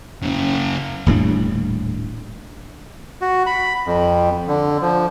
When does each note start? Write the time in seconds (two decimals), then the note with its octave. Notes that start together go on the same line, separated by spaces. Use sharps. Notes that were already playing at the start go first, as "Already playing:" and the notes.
0.23 F#2 C#3
1.06 D#1 A2 G3 D4
3.21 F#4
3.46 B5
3.86 F2
4.48 D3
4.82 F3